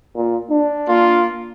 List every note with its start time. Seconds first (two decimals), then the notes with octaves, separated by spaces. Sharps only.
0.16 A#2
0.51 D4
0.89 A#3 F4